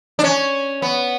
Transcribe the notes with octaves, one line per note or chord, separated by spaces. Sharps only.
D4
C#4
B3